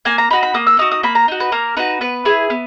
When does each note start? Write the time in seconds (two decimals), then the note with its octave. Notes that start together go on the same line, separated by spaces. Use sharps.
0.05 A#3 G#5
0.18 A#5
0.31 D#4 F#4 B5
0.43 B5
0.54 A#3 D#6
0.67 E6
0.79 D#4 F#4 D#6
0.92 D#6
1.03 A#3 B5
1.15 A#5
1.28 D#4 F#4
1.40 B4
1.52 A#3 A#4
1.77 D#4 F#4 B4
2.01 B3 B4
2.25 E4 G#4
2.50 B3